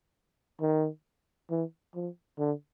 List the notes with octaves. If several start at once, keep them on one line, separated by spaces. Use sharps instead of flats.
D#3
E3
F3
D3